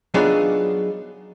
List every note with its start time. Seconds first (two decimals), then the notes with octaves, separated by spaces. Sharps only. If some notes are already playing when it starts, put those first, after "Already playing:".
0.14 F#3 B3 D4 D#4 F4 G#4